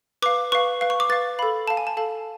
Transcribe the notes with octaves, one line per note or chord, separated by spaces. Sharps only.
B4 F5 D6
B4 F5 C#6
B4 F5
C#6
D6
B4 F5 A6
A4 F5 B5
A4 F5 A5
G#5
A5
A4 F5 A5